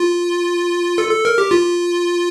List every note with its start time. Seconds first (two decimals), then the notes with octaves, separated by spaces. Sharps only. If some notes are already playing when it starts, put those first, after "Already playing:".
Already playing: F4
0.98 A4
1.11 A4
1.25 A#4
1.38 G4
1.51 F4